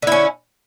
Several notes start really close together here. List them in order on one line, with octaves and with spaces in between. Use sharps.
D3 E4 C#4